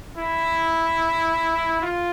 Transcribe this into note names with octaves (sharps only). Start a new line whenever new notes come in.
E4
F4